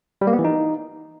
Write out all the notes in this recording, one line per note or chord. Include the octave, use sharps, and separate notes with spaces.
G3
A#3
B3
E3
D#4